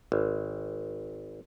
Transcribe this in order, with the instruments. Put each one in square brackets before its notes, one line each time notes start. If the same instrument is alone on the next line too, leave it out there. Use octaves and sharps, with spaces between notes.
[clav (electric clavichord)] G#1